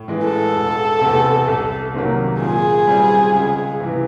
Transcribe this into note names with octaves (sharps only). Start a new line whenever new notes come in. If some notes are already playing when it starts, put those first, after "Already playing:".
Already playing: A2
E3 G#3
A4
E1
E2 C3
C2
C3 D#3 F#3 A#3
A#2 G#4
G3 C4
C#2
C3 E3